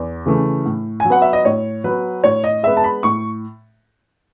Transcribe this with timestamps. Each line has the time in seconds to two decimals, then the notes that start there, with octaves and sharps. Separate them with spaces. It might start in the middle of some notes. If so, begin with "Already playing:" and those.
Already playing: E2
0.26 C#3 E3 A3
0.66 A2
1.00 G#5
1.05 F#3
1.10 B3 F#5
1.22 E5
1.33 D#5
1.45 A2 C#5
1.84 F#3 B3 B4
2.24 A2 C#5
2.44 D#5
2.63 G#3 B3 E5
2.77 A5
2.84 B5
3.03 A2 C#6